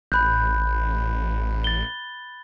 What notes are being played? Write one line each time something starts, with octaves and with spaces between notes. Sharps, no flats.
A1 B5 F#6 G6
A6 G7